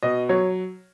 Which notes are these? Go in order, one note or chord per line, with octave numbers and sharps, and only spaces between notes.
B2 D#5
F#3 C#5